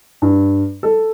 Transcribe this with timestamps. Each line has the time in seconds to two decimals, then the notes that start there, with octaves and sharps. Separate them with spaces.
0.22 G2
0.83 A4